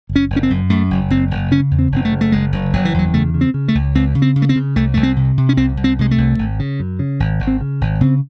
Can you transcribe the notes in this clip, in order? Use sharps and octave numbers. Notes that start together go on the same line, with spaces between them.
F#1
C#4
F#1
C#4
C4
F#2
F#2 A3
F#1
F#1 C4
F#1
C#3 C#4
E2
C4
F#1 C4
A3
C#3
A3
F#1 G#3
F#1
F#1 F#3
E3
E2 F#3
C#3 A3
C#3
C4
C#3
A3
C#2
C#2 C4
C#3
C4
C#3
A3
C4
C#3
C2 A3
C2 A3
C4
C3
C3
C#4
C2 C4
C2
C4
C3 G#3
A3
C2
G#1
C#3
F#2
C#3
G#1
G#1
C4
C#3
G#1
C#3 C4